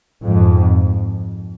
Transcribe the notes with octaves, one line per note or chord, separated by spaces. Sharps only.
F2 G#2